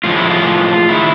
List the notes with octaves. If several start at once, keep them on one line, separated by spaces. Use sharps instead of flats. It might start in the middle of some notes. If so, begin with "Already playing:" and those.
A2 F3 G#3 F4
E4
F4
D#3 G#3 E4